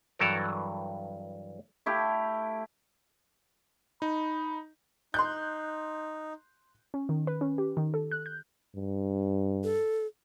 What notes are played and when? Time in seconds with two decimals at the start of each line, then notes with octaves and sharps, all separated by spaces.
0.19 G2 E3 F#3 A4 A#4
1.86 A3 E4 G4 F5
4.02 D#4 B5
5.14 D#4 C6 F#6 G6
6.94 C#4
7.09 D#3
7.27 B4
7.41 C#4
7.58 G4
7.77 D#3
7.94 A4
8.11 F#6
8.26 G6
8.76 G2
9.64 A4